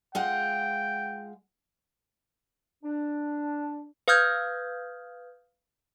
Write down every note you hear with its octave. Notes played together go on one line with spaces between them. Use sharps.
G#3 F4 F#5 G5
D4
B4 F5 D#6 F6 G6 G#6